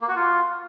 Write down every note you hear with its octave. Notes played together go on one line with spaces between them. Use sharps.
A#3
F#4
F4